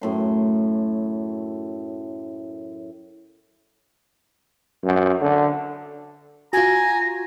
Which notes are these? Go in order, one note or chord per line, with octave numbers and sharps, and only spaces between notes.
F#2 A2 C6
F#2
D3
F4 F#4 G#5 A#5